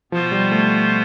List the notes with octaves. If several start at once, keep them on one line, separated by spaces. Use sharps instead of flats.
B2 F3 B3 F4 C5
G3
A3